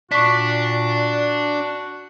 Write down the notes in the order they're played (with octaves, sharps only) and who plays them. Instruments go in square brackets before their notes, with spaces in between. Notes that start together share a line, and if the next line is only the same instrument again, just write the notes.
[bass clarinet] A#2 [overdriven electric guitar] D4 [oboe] F#4 [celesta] C#6 B6